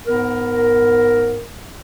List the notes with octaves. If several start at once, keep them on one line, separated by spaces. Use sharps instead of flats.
G#2 B3 A#4